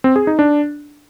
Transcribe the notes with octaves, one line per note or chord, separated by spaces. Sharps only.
C4
G#4
D#4
D4